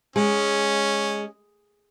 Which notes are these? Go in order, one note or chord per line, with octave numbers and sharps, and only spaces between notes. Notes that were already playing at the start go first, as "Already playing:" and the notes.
G#3 C#4